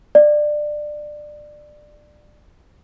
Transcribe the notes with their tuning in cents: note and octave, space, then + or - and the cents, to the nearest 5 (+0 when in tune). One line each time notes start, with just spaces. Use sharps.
D5 +20